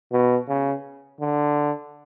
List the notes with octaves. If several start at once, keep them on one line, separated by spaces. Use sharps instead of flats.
B2
C#3
D3